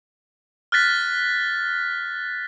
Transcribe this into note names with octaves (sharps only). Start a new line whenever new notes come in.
F6 F#6 A6 B6